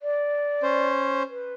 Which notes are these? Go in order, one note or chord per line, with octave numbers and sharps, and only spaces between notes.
D5
C#4 C5
B4